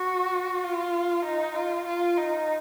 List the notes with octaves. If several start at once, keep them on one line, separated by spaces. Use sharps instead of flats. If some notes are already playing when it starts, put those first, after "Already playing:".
Already playing: F#4
F4
D#4
F4
F4
D#4